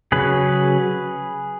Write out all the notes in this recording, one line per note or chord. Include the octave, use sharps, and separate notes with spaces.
C#3 F#3 C#4 G#4 B4